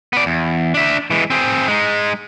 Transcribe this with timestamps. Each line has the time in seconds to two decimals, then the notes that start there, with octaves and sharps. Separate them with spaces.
0.13 B3 D5
0.26 E2
0.74 D4 E5
1.11 E3 G#3
1.30 C4 G#4
1.68 G#3 D#4